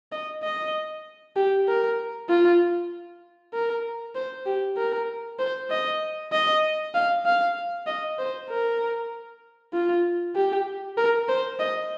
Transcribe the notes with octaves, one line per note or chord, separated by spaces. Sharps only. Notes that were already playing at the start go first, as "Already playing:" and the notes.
D#5
D#5
G4
A#4
F4
A#4
C5
G4
A#4
C5
D#5
D#5
F5
F5
D#5
C5
A#4
F4
G4
A#4
C5
D#5